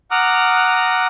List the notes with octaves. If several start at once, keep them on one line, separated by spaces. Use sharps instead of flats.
F#5 A#5 D6 D#6 F6 F#6